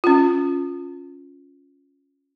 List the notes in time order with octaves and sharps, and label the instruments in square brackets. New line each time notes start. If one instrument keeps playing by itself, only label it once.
[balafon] C#4 F4